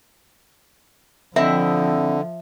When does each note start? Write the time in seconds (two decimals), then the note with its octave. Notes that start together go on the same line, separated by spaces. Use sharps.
1.36 D3 F3 C4 E4 D#5 E5